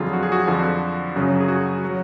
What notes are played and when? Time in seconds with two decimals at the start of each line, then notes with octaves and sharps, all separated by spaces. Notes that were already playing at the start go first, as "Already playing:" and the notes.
Already playing: F2 D3 F#3 F4 G#4
0.13 F#4
0.23 G#4
0.32 F#4
0.47 F2 D3 F3
1.15 F#2 C#3 F#3
1.40 G#4
1.48 F#4
1.85 F#3